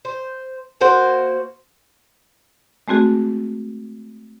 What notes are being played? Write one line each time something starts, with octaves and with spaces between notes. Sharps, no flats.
C5
A#3 F#4 C5
G#3 A3 C4 F#4 G#4